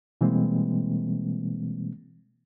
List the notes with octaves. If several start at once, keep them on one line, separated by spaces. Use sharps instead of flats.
B2 E3 G3 G#3 A#3 C4